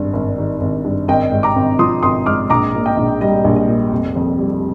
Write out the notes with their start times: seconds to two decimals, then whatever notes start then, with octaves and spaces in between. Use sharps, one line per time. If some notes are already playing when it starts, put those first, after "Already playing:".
Already playing: G#1 G2
0.13 G#1
0.38 D#3
0.61 G#1
0.84 G2
1.08 G#1 D#5 G5
1.32 G#2
1.43 A#5 D6
1.56 G#1
1.79 F3 C6 D#6
2.03 G#1 C6 D#6
2.26 G#2 D6 F6
2.50 A#1 A#5 D6
2.74 A#2
2.86 D#5 G5
2.97 A#1
3.21 G3 D#5
3.44 A#1
3.56 D#5
3.68 A#2
3.92 F1
4.15 F2
4.39 G3